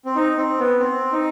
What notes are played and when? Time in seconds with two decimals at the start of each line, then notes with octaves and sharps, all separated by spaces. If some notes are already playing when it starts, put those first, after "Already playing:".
0.05 C4
0.15 D#4
0.37 C4
0.59 B3
0.80 C4
1.12 D#4